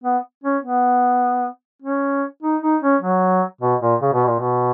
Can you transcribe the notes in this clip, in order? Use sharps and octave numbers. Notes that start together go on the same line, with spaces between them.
B3
C#4
B3
C#4
D#4
D#4
C#4
F#3
B2
A#2
C#3
B2
A#2
B2